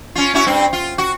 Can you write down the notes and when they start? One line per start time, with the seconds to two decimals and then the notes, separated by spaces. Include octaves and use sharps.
0.15 C#4 F4
0.34 C#4 E4 F#4
0.47 G2 C4
0.73 F4
0.98 F#4